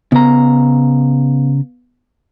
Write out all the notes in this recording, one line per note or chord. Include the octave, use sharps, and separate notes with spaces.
C#3 B3 A#5